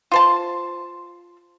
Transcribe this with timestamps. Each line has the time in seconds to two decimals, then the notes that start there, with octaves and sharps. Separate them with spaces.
0.12 F4 C5 A5